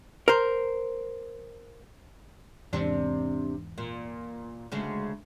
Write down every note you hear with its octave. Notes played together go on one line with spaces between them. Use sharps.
A#4 C5
E2 G#2 C3 C4 D4
A#2
D2 C#3 G#3